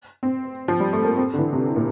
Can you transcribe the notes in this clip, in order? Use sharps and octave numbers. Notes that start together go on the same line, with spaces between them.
C4
F3
G3
A3
A#3
C4
D3
E3
C3
D3
A#2